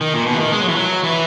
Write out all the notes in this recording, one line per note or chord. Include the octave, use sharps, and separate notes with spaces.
D#3
A#2
B2
E3
D#3
G#3
F#3
E3
F#3
E3